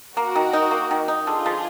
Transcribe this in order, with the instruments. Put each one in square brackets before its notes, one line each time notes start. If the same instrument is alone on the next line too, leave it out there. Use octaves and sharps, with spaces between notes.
[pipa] A#3 [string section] F#4 A#4
[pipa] D#3
D#4
A#3
D#3
D#4
[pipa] D3 [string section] F4 G#4
[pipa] F3